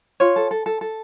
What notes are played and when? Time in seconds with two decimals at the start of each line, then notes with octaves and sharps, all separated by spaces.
0.20 F4 C#5
0.36 A4
0.51 A4
0.66 A4
0.81 A4